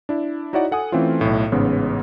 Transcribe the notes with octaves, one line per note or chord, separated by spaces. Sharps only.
D4 E4
D#4 E4 F#4 C#5 D5 F#5
A4 F#5 G#5 D#6
E3 A3 C4 C#4 F4
B1 A2
A1 G#2 C#3 B3